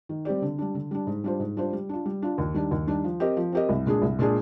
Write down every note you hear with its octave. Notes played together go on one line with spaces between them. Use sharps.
D#3
G3 C4 G4 D5
D3
G3 D4
D3
G3 D4
G#2
G3 D4 F4 C5
G#2
G3 D4 F4 C5
G3
D4 F4
G3
D4 F4
D#2
D#3 G3 D4
D#2
D#3 G3 D4
F3
C4 G4 A#4 D#5
F3
C4 G4 A#4 D#5
C2
A#2 G#3 D4 G#4
C2
A#2 G#3 D4 G#4